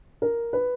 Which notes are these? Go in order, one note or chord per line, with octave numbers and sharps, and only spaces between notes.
A#4
B4